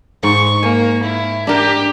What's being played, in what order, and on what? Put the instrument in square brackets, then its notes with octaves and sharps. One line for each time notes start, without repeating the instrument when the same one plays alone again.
[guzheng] G#2 [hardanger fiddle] C#6
[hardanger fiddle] A#3 [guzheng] G#5
[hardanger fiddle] E4
[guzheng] D4 A#4 [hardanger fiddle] G4